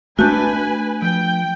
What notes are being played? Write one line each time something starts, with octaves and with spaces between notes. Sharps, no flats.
A3 A#3 D4 F#4 B4 G#5 A5 G6
F3 G5